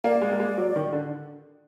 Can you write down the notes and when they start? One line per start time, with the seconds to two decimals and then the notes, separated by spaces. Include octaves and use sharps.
0.04 A#3 D5
0.22 G#3
0.32 A#3
0.40 G#3
0.57 F#3
0.76 D#3
0.92 D3